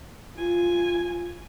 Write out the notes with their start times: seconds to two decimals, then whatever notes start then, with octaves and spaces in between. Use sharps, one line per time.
0.36 F4 G#5